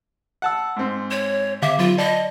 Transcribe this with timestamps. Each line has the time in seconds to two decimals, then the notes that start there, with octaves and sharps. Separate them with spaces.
0.42 F#5 A5 E6
0.76 G#2 C4
1.11 C#5
1.62 D3 E5 F5 D6
1.79 F#3 F4
1.98 D5 D#5 A5